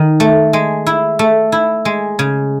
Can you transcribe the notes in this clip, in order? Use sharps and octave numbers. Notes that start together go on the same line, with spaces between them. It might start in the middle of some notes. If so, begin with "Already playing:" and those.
Already playing: D#3 D#4
A3
G#3
E4
A3
E4
G#3
C#3